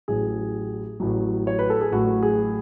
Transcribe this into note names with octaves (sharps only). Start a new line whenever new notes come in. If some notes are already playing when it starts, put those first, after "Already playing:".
A1 A2 F#3 G#4
A1 A2 F#3
C#5
B4
A4
G#4
A1 A2 F#3 F#4
G#4